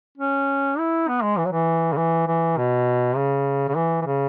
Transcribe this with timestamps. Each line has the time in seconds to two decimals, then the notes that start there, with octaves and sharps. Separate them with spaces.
0.18 C#4
0.78 E4
1.08 B3
1.23 G#3
1.38 E3
1.45 F#3
1.52 E3
1.93 C#3
1.97 E3
2.28 E3
2.57 B2
3.16 C#3
3.68 C#3
3.76 E3
4.01 E3
4.06 C#3